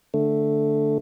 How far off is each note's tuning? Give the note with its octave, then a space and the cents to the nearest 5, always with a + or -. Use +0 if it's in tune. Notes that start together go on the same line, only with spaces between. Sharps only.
D3 +0 A3 +0